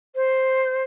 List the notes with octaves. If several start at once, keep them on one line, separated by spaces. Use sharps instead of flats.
C5